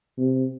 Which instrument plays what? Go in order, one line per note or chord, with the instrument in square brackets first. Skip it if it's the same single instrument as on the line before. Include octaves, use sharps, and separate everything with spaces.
[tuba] C3